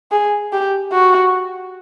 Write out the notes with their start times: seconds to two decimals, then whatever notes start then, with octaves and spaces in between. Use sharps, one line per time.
0.12 G#4
0.53 G4
0.92 F#4